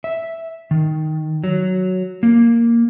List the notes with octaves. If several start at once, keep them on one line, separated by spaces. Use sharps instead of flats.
E5
D#3
F#3
A#3